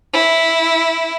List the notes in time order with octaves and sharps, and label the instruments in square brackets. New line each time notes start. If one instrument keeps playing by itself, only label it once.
[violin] E4